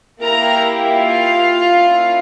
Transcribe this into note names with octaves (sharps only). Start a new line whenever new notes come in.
A#3 E4 G4 A#4 A#5
F4 F5
A#3 C#4 E4